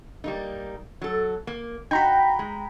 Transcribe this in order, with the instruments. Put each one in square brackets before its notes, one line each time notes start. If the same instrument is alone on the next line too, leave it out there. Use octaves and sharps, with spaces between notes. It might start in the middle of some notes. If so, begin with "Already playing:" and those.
[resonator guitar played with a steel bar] G3 A#3 D#4
F#3 A4
A#3
[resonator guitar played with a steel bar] D#4 F#4 [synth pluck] G5 A#5 B5
[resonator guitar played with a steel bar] G#3